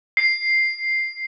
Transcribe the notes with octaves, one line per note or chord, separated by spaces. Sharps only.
C7